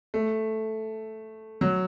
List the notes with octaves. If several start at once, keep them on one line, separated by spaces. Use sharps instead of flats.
A3
F#3